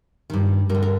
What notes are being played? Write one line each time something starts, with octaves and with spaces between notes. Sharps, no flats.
G2 D#3
G2 A#4
D3
A#4